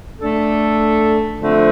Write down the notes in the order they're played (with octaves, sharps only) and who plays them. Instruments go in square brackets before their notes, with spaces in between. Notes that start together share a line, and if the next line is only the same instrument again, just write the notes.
[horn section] A3 D4 A4
D3 F3 A3 C4